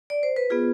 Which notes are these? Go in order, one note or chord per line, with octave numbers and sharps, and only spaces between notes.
D5
C5
B4
B3 F4 G#4